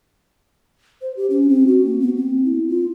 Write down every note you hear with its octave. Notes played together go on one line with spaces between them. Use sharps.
C5
G4
C#4
C4
F#4
A#3
B3
C4
E4
F4